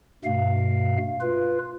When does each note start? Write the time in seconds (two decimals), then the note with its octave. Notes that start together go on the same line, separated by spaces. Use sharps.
0.25 G2 B2 A3 F5
1.21 F4 B4